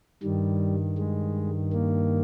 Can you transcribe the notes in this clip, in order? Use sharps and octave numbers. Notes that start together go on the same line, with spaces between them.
G2 D#3 G3
G#3
A#3